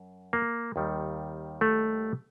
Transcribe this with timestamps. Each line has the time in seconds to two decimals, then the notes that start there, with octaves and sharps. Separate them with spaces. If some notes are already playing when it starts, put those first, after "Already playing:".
Already playing: F#2
0.33 A#3
0.76 D#2 D#3 G3
1.61 A3